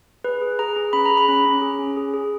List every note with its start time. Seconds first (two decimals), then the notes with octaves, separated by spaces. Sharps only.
0.24 G#4 B4
0.41 G#4
0.59 G#4 A#5
0.76 G#4
0.93 C#4 B5
1.05 A#5
1.11 G#4
1.17 B5
1.28 C#4
1.45 C#4
1.62 G#4
1.79 C#4
1.97 G#4
2.14 G#4